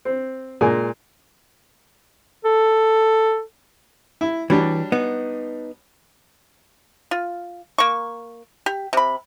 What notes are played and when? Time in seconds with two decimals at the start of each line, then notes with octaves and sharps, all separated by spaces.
0.05 C4
0.61 A#2 G#3 G#5
2.45 A4
4.21 E4
4.50 E3 F#3 G3 D4
4.92 B3 D#4
7.11 F4
7.78 A#3 C#6
8.66 G4
8.93 C3 B5